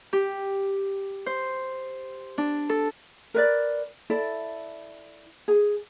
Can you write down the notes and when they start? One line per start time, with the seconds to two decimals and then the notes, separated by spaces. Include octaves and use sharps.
0.13 G4
1.26 C5
2.38 D4
2.69 A4
3.34 A#4 B4 D5
4.10 E4 A4 D5
5.48 G#4